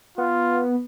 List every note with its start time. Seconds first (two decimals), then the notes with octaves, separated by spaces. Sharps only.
0.18 B3 F4